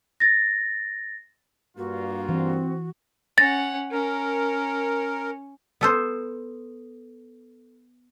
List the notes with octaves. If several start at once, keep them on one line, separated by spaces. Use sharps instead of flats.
A6 A#6
G2 A#3 F4 F#4
E3 C4
C#4 F#5 A6 A#6
C#4 A#4
B3 A4 C5